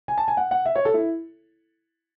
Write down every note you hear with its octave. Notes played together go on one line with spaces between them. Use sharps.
G#5
A5
G#5
F#5
F#5
E5
C#5
A4
E4